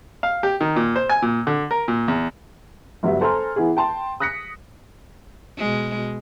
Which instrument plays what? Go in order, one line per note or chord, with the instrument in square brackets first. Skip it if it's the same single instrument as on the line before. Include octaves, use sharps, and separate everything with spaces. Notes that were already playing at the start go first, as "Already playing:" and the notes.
[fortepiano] F5
G4
D#3
A#2
C5
G#5
A#2
D3
A#4
A#2
E2
[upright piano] G1 F#3 G3 E5
A4 C5 G#5 A#5 C6 F6
E3 B3 E4 G#4
G5 A5 C6
D#6 F#6 A#6 B6 C#7
[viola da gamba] B2 G#3